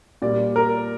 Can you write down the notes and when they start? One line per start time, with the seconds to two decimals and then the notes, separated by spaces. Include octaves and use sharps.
0.22 A#2 G3 D5
0.56 A#4